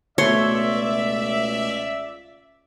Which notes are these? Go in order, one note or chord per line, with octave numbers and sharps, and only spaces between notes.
C#2 B2 A3 C#5 D5 E5 C6